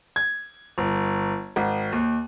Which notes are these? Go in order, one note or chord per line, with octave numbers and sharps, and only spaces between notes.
G#6
G1
G#1
D#2